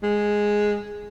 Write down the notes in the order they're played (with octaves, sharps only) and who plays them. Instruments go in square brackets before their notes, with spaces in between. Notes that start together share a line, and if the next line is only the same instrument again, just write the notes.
[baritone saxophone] G#3